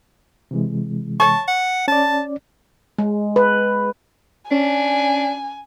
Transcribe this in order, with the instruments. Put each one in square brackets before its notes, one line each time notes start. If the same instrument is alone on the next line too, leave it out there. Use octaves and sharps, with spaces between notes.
[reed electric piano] C3 E3 G#3
[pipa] C#5 C#6 [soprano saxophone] A5
[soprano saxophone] F#5
[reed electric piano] C#4 D5 [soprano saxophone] A5
[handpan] G#3
B4
[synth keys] C#4 [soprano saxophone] D4 [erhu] G#5